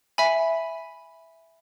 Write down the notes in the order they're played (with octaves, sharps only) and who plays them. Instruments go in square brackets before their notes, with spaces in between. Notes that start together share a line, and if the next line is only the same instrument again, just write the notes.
[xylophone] E5 G#5 B5